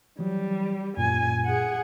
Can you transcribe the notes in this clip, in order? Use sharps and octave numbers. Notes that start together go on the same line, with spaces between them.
E3 F#3 G3
F#2 A#2 G#5
G#4 F#5